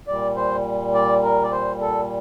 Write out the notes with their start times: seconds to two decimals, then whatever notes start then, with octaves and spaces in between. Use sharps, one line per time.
0.07 A#2 G3 D5
0.36 C5
0.94 D5
1.23 A#4
1.44 D5
1.52 C5
1.81 A4